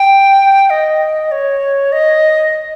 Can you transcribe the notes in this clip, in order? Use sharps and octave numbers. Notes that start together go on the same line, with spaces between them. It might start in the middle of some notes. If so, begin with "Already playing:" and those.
Already playing: G5
D#5
C#5
D#5